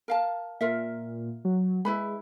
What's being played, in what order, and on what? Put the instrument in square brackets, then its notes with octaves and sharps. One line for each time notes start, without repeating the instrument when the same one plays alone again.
[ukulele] A#4 F5 A5
[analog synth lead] A#2 [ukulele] F4 A#4 E5
[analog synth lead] F#3
[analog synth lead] G#3 [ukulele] E4 B4 B5